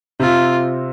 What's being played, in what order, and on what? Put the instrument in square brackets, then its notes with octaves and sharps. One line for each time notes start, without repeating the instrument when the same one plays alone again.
[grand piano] C3 C4 [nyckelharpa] F4